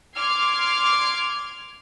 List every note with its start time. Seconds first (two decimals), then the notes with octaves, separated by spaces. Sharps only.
0.15 C6 D6 F6 G#6 C7